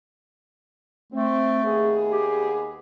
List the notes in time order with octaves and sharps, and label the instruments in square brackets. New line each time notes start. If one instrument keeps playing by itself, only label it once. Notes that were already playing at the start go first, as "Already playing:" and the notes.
[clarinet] A3 [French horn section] C4
[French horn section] D#2 B3 G#4
[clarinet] G4